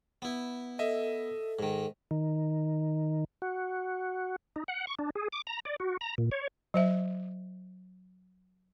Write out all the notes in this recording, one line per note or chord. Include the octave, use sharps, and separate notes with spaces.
B3 E4
A4 D#5 E5
G#2 D#3
D#3
F#4
D#4
F#5
C#6
D4
G#4
D6
A#5
D5
F#4
A#5
A#2
C#5
F#3 C5 E5